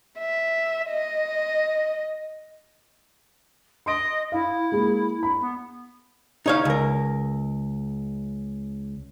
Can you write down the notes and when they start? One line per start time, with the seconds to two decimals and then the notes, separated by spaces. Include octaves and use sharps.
0.20 E5
0.90 D#5
3.86 D#5 C6 D7
4.32 E4 F5
4.72 G#3 A#3 G#4
5.23 B5
5.40 B3
6.46 D#4 C#5 F5
6.65 C#2 A#4